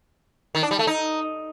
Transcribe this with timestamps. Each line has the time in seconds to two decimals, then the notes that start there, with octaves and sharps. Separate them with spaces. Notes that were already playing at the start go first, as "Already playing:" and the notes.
0.55 D#3
0.63 D4
0.71 G3
0.79 A3
0.87 D#4